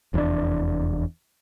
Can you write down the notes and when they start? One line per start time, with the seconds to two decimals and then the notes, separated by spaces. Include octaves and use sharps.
0.14 F1 E2 G#2 D4